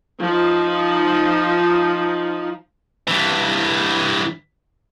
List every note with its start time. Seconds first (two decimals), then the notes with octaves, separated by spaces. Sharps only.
0.21 F3 D#4
3.08 G2 E3